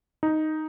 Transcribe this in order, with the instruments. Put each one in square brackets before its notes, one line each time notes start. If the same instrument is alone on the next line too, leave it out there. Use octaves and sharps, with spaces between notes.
[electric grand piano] D#4